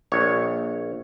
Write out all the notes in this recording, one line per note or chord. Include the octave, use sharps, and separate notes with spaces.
A#1 C#5